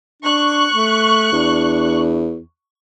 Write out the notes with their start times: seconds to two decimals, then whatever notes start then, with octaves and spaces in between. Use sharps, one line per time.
0.22 D4 C#6 F#6
0.74 A3
1.32 E2 D4